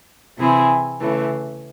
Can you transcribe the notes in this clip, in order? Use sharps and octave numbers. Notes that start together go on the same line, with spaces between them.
C3 E3 C4 E4 G#4
C#3 E3 A3